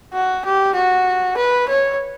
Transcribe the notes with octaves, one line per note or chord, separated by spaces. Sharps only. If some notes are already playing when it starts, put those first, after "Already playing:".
F#4
G4
F#4
B4
C#5